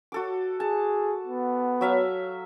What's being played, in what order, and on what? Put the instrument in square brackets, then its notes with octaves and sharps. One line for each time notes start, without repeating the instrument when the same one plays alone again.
[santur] F#4 A4 D6
[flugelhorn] G#4 [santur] A5
[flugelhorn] B3
[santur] F#3 E5 F5